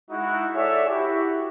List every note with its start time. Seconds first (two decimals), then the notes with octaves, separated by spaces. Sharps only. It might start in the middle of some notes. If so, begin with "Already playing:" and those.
0.10 G#3 D#4 E4 F#4
0.54 G#4 A4 C#5 D5 E5
0.88 E4 F#4 G4